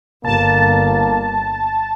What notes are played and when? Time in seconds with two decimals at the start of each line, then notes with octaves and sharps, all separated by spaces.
0.25 G1 A#3 A5